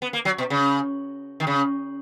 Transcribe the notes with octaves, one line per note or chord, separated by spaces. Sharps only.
B3
A#3
F#3
B2
C#3
D#3
C#3